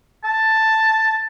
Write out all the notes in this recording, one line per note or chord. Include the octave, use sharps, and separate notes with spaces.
A5